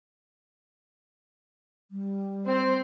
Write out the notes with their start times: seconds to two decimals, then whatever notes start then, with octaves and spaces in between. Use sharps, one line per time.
1.91 G3
2.46 C4 C5